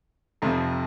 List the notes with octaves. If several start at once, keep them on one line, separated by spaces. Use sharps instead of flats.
F1 F2 C3 F3